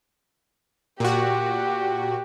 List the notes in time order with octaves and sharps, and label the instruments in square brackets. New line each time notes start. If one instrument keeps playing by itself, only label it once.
[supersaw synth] A#2 F#4 [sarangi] G4